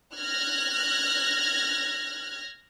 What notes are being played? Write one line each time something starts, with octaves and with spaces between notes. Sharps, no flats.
F6 F#6 G#6 A#6